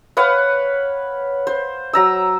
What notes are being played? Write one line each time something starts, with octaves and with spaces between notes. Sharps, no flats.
B4 C#5 F5 F#5
C5
F#3 A#5 E6